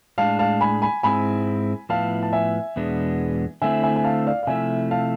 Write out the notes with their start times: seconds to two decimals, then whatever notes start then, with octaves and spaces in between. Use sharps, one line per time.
0.18 A2 G#3 D4 F5 A5
0.39 F5 A5
0.61 G#5 B5
0.82 G#5 B5
1.03 G#2 G#3 C4 E4 G#5 B5
1.89 A2 F3 B3 E4 F5 A5
2.23 A5
2.33 E5 G#5
2.76 E2 B2 G#3 B3 D4
3.62 D3 A3 C4 E4 E5 G#5
3.83 E5 G#5
3.96 G#5
4.04 F5 A5
4.27 D5 F5
4.43 F5
4.47 C3 F3 A3 E4 E5 G#5
4.91 F5 A5